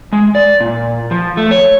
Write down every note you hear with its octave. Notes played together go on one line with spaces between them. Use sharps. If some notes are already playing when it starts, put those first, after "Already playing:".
G#3
D5
A#2
F3
A3
C#5